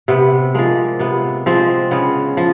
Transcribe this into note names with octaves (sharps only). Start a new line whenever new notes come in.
C3 B3
F3 G#3 A#3
C3 B3
F3 G#3 C4
C#3 B3
F3